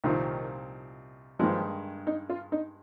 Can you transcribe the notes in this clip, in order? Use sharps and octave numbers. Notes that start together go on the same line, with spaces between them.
C2 A#2 D#3 F3 C4 D#4
G2 D#3 F3 G#3
D#4
F4
D#4